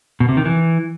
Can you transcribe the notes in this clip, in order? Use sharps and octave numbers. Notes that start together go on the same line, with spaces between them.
B2
C3
D#3
E3